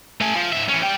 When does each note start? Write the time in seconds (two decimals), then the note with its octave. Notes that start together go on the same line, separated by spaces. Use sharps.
0.21 A3 G#5
0.35 F3
0.52 G#2 E5
0.69 E3 C#4
0.82 G3 G5